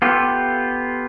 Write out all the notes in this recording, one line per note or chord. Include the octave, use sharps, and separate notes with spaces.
B3 F4 G4 A4